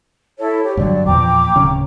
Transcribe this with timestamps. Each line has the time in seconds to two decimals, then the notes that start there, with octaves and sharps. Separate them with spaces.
0.38 E4 A4 C#5
0.63 G4 C#5
0.77 G2 D3 F#3 D5
1.06 E2 A#2 F3 G5 A#5 D6
1.56 D1 C#3 C#4